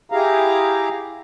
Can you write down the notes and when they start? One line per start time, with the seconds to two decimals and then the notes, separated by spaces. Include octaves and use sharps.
0.12 E4 G4 G#4 F5 A#5